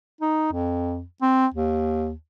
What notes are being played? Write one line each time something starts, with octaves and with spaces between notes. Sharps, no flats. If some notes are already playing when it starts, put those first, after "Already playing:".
D#4
F2
C4
D#2